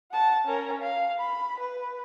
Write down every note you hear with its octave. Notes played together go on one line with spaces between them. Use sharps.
F#5 A5
C#4 A#4
F5
B5
B4